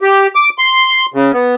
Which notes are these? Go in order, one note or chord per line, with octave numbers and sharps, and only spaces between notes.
G4
D6
C6
C#3
B3